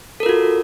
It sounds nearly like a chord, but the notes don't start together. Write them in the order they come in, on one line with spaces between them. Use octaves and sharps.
A4 A#4 F4 F#4